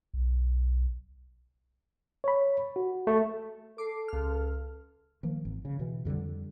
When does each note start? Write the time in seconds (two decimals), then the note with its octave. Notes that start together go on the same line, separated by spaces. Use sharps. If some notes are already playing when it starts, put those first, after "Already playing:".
0.14 B1
2.24 C#5 B5
2.76 F#4
3.07 A3
3.78 A4 D6 C7
4.08 C#2 F6
5.23 D#3 F3 A#3
5.45 G#1
5.65 C#3
5.79 B2 E3
6.05 F2 D3 D#3 G3